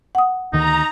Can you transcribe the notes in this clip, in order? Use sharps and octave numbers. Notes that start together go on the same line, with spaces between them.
F#5 D#6
D2 D#3 D#4 A#5